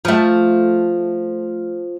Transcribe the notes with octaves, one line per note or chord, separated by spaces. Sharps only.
F3 A3